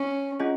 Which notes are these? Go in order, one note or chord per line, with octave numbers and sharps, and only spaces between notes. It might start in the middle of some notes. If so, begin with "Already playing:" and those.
Already playing: C#4
C#4 F4 G#4 D#5 G#5